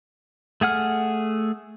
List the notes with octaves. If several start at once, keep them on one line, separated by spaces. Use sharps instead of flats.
A3 G#4 F#5 F6